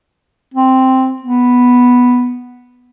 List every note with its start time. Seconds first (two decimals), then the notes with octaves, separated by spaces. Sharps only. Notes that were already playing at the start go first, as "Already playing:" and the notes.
0.54 C4
1.22 B3